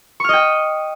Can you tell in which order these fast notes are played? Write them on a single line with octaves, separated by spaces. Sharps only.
C#6 F6 D#5 G5